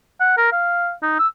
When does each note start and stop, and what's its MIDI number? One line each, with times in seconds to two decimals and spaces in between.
0.20 0.35 78
0.38 0.52 70
0.52 0.92 77
1.02 1.16 63
1.19 1.28 88